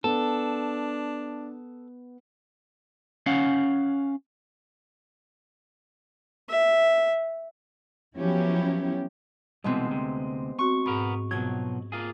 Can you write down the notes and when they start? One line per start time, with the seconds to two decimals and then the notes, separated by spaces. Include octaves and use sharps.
0.04 B3 D4 A4
3.26 C#4 F5 F#5
6.49 E5
8.17 F3 F#3 B3 C#4 E4 G4
9.64 C2 B2 E3 G#3 B3 C4
9.87 D2 C3
10.59 C4 F#4 C#6
10.86 G#2 B2 B3 A#4 B5
11.31 B2 F3 F#3 G#6
11.92 A#3 F4 G#4